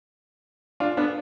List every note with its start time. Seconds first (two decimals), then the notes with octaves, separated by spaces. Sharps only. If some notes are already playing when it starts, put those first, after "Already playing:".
0.80 D4 F4
0.97 B3 D4